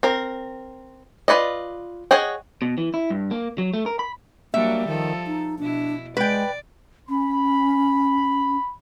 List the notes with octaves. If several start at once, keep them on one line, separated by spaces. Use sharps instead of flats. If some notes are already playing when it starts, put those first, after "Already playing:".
C4 A#4
F4 F#4 B4 D5 D#5
G#4 C#5 D#5 F#5 G5
B2
E3
E4
G2
A#3
F#3
A3
A#4
B5
F#3 G3 A#3 D4 E5
D#3 F3 A4
D#4
B2 D4 E4
G#3 B4 D5 G5
C#4 B5